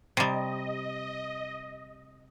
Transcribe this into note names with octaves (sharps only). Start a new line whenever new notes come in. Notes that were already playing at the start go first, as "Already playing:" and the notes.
C3 G3 D#5